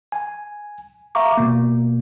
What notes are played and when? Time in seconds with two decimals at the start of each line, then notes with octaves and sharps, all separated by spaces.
0.12 G#5
1.15 E5 F5 A#5 C#6 D6
1.37 B2 A#3